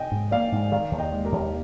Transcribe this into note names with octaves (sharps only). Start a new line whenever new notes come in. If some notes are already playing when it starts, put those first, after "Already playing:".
Already playing: D#5 G5 G#5
G#2
A#3 D5 F5
G#2
D#3 D5 F5
D#2
D#5 G5
G#3
G4 A#4
D#2